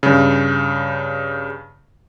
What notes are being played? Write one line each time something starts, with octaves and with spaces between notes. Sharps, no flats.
G2 C#3